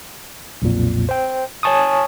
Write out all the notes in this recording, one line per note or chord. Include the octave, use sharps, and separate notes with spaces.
B1 F2 A#2
C5 G5
C#5 G#5 A5 C#6 D#6